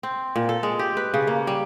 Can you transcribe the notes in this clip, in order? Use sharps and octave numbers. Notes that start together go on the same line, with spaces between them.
C4
A#2
A4
G#3
G4
B4
C#3
A#3
G3